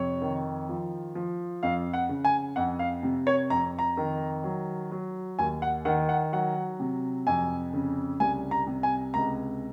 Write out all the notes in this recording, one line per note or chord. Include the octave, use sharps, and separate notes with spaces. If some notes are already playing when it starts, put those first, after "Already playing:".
Already playing: F2 C3 C#5
D#3
F3
F3
F2 F5
F#5
C#3
G#5
F2 F#5
F5
C3
C#5
F2 A#5
A#5
D#3
F#3
F#3
D#2 G#5
F#5
D#3 F#5
F#5
F#3 F#5
C3
F2 G#5
C#3
C2 G#5
A#5
C3
G#5
C#2 A#5